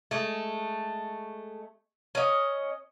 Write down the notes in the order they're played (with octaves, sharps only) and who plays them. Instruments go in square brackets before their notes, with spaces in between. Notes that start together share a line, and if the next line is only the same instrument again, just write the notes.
[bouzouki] G#3 A3
C#4 D#5